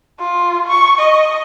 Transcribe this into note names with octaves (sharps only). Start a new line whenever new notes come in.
F4
C#6
D#5